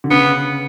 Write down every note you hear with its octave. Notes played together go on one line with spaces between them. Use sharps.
D3
C#3 B3